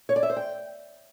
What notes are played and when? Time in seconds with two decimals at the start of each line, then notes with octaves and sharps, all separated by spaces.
0.09 C#5
0.16 D5
0.23 E5
0.30 C5
0.36 G5